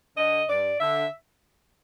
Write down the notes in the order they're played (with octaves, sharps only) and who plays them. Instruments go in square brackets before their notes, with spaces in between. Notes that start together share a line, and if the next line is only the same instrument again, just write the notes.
[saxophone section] D3 D#5
G2 D5
D3 E5